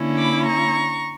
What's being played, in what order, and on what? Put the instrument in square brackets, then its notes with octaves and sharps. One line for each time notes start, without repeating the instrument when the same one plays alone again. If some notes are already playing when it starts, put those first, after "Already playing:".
Already playing: [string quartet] D3 A#3 C#4 E4
B5 D6
A#5 C#6